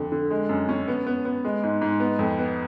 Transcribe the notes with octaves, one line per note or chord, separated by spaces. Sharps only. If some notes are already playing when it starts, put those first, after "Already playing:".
Already playing: F2 D3
D3
G#3
F#2
C#4
B3
B3
B3
G#3
G#2
G#2
B3
F2
B3